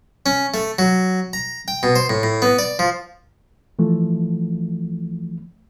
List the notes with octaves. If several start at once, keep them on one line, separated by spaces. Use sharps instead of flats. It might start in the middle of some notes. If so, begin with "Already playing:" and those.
C#4
A3
F#3
A#5
G5
B2
C5
A2
A2
B3
D5
F3
E3 F3 A3